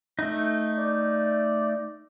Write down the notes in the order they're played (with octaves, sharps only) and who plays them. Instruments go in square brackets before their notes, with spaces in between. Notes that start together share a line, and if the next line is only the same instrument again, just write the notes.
[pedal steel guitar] A3 D#4
[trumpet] D5